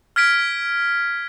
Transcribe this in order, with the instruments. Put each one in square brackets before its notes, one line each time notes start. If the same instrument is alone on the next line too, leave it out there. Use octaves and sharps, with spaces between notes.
[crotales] F6 G#6 B6 D7